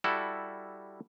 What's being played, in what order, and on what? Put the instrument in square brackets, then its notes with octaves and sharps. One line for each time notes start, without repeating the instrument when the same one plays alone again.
[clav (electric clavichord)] G3 E4 F#4 A4